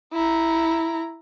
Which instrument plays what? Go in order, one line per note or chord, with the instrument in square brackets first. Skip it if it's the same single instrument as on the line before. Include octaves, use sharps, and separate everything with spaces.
[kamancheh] E4 A#5